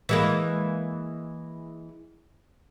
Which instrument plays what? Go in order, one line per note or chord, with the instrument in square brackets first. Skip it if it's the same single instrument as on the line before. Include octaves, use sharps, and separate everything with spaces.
[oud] E3 G#3 A#3